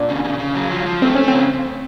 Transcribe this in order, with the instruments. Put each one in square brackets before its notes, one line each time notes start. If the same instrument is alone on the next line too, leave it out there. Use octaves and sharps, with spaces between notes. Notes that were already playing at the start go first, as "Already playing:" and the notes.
Already playing: [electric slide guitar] A#2 [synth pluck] D4
[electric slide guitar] C#3
C#3
C#3
F#3
F3
F3
[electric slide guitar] A3 [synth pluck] C4
[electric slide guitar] A3 [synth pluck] C#4
[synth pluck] C4
[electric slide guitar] C#3